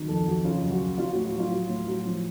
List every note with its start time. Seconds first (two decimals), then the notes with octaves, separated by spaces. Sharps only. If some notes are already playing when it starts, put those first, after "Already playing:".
Already playing: D#3 F#3
0.08 F2 A4
0.26 F2 F#4
0.44 C#3 F4
0.63 F#2
0.71 F#4
0.80 F#2
0.98 F#3 F4
1.11 F#4
1.15 A2
1.25 F#4
1.34 F#3 F4
1.51 F#3
1.69 A2
1.87 F#3
2.05 F3